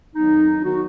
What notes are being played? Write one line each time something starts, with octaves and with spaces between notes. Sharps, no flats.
F2 D#3 F#3 B3 D#4
D#3 F#3 B3 D#4 F#4